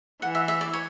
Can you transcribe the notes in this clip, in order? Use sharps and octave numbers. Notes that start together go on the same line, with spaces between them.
E3 F#5
E5
E5
D5
C#5